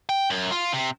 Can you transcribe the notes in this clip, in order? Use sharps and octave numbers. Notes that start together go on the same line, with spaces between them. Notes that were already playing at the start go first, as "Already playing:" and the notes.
G5
F#2
F4
C3